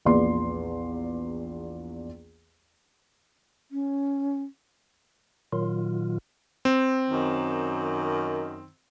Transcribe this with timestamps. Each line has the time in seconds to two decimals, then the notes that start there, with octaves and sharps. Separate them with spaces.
0.05 A#1 E2 D5 C6
3.71 C#4
5.53 A#2 D#3 F#3 F4
6.65 C4
7.09 F#2 D#3